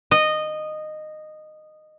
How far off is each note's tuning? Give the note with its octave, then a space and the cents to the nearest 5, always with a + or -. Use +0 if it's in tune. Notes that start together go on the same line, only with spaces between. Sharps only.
D#5 -15